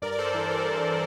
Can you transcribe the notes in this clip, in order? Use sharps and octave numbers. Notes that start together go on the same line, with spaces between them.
G2 A#4 D5
D5
G2 A4 C5
E3
E3 A#4
G2